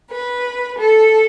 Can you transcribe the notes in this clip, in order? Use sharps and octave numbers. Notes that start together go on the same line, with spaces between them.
B4
A4